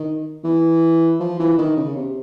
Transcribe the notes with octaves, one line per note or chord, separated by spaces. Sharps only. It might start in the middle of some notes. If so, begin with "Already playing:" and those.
Already playing: D#3
E3
F3
E3
D#3
C#3
C3